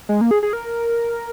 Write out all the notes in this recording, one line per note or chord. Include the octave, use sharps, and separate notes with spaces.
G#3
A#3
G#4
G#4
A#4